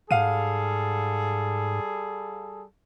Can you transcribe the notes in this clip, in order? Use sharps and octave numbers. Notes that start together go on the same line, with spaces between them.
G#2 G3 G#4 A4 F5 F#5 D#7